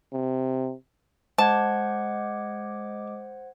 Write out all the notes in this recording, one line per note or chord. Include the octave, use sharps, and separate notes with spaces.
C3
G#3 C5 D#5 F#5 A5 D6 G#6